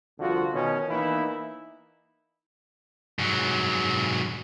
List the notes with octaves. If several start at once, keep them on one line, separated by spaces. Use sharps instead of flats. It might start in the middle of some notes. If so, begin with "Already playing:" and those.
C2 D3 F3 F4 F#4
B2 D#3 C#4
E3 A#3 B3 D#4 E4
G#2 F#3